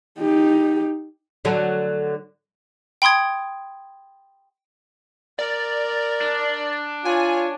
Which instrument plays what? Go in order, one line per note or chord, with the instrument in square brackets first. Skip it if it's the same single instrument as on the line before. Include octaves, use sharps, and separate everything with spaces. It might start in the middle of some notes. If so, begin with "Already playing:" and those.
[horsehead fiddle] D#4 G4
[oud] D3 F#3 A3
[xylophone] G5 B5 C6 D#6 G#6
[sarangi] A#4 [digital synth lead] D5
[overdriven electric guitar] D4
[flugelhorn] F4 [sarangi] C#5 [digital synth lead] G#5